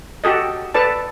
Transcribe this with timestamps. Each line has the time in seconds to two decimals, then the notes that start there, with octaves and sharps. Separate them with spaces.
0.24 F#4 G4 A4 D#5
0.74 A4 B4 D5 A5